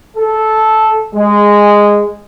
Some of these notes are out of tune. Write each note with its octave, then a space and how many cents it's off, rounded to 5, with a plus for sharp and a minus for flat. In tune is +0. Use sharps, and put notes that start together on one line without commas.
A4 -10
G#3 -10